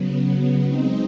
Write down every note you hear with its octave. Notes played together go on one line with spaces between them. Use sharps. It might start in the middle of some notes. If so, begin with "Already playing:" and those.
Already playing: C#3 F#3 B3
G#3 C4 D#4